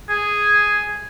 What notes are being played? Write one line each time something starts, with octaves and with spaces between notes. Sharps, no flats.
G#4